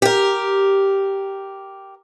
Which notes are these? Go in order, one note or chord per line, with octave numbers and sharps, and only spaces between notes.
G4 A#4